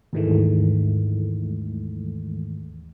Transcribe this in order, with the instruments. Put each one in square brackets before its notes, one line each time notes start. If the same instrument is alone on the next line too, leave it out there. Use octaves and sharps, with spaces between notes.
[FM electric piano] D#2 G#2 D#3 E3 G#3 A3